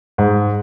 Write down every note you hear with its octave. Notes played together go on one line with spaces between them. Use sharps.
G#2